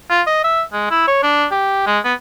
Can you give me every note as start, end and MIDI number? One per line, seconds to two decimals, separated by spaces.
0.10 0.21 65
0.27 0.44 75
0.44 0.62 76
0.73 0.91 56
0.91 1.05 64
1.08 1.23 73
1.23 1.46 62
1.51 1.84 67
1.87 1.99 56
2.05 2.13 59